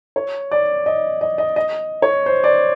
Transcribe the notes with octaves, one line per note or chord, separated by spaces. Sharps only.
C#5
D5
D#5
D#5
D#5
D#5
C#5
C5
D5